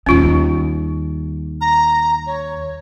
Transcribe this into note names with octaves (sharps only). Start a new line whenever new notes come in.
D#2 G3 C#4 F4
A#5
C#5